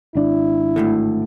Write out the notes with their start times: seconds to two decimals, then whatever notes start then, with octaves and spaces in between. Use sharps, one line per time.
0.15 G#1 D4 E4
0.76 D2 A2 D3